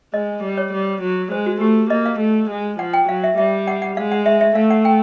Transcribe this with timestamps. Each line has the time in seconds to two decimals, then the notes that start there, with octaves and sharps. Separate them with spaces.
0.14 G#3 D#5
0.43 G3
0.58 C#5
0.73 G3
1.02 F#3
1.32 G#3 C5
1.46 F#4
1.61 A3 G4
1.90 A#3 D#5
2.06 F5
2.19 A3
2.50 G#3
2.79 F3 F#5
2.94 G5
3.08 F#3 F5
3.24 E5
3.37 G3 E5
3.67 F#5
3.82 F#5
3.97 G#3 F5
4.12 F#5
4.26 E5
4.41 E5
4.55 A3 F5
4.70 F#5
4.85 G5